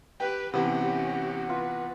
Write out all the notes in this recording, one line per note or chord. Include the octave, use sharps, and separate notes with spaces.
G4 B4 G5
C3 E3 B3 C#4 F#4 G4
F4 B4